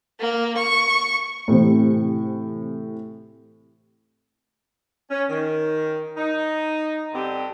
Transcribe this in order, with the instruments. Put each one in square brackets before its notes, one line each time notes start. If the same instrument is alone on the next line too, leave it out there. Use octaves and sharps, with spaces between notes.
[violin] A#3
C#6
[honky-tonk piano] A2 C3 E3 C4
[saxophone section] C#4
D#3
D#4
G2 D3 C4 G4